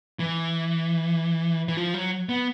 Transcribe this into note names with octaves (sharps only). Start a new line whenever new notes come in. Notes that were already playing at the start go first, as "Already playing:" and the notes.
E3
E3
F3
F#3
B3